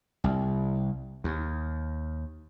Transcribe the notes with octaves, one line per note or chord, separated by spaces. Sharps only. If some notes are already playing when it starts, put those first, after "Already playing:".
C2
D#2